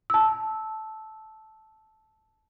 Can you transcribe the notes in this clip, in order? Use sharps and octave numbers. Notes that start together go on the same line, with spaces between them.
A5 E6